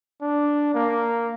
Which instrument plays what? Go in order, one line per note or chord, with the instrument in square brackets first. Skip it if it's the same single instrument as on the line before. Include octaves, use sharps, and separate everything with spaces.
[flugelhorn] D4
A#3